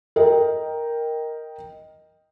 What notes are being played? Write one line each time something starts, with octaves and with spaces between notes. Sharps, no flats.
A#4 D#5 G5